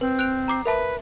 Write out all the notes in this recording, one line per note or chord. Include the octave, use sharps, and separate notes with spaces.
C4 B4
F#6 D7 F7
A#5 D6 C7
A#4 B4 E5 A5